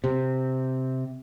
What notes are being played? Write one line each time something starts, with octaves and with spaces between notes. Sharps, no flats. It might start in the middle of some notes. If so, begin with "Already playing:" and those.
C3